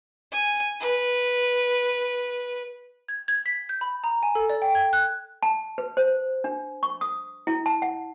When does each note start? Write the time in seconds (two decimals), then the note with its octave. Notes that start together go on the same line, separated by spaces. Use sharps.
0.32 G#5
0.81 B4
3.08 G#6
3.28 G#6
3.46 B6
3.69 G6
3.81 B5
4.04 A#5
4.23 G#5
4.35 A4
4.49 D5
4.62 G5
4.75 G#6
4.93 F#6
5.43 A5
5.78 B4
5.97 C5
6.44 D4
6.83 C#6
7.01 D#6
7.47 E4
7.66 A5
7.82 F#5